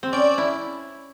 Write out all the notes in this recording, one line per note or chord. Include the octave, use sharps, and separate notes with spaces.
C4
C#4 D5
E4